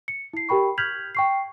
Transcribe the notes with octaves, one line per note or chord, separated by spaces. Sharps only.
C#7
E4 C7
G4 A#4 G5 B5 C#6
F6 G6 G#6 B6 F7 F#7
G5 C#6 C7